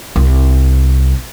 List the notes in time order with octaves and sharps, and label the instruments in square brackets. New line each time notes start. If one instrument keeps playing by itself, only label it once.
[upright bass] C2